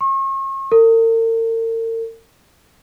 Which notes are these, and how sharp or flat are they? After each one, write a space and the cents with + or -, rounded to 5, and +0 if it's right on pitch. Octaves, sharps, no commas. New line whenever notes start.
C#6 -40
A#4 -45